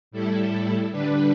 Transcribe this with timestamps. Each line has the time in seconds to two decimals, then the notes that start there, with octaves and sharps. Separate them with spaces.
0.11 A2 G3 E4 A4
0.92 D3 G3 D4 B4